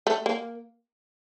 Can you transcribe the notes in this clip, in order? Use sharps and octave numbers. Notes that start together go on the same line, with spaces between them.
A3
A#3